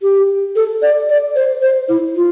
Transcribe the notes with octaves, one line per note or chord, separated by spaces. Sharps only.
G4
A4
D5
D5
C5
C5
E4
F4